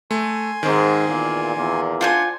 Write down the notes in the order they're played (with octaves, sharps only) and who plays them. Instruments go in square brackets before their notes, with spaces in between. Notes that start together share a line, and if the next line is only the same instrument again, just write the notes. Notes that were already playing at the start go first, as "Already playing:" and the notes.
[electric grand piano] A3 [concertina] G#5 C6
[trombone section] G#2 [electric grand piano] D#3 C4
[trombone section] E2 A#2
E2 A#2
[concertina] D4 F#5 [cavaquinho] F4 C5 G#5